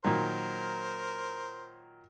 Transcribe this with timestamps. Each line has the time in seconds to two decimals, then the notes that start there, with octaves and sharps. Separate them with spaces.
0.04 A#2 D#3 F#3 A#4 C5